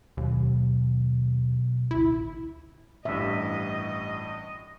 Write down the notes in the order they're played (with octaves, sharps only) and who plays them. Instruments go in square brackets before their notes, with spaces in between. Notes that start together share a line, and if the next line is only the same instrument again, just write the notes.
[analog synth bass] D#2 [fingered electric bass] B2 F#3
[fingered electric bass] A1 D2 [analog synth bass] E4
[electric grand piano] A1 G2 [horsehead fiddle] D#5 [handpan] E5